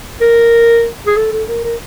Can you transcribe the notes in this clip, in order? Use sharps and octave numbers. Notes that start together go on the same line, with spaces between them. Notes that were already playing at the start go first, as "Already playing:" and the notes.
A#4
G#4
A4
A4
A#4
A#4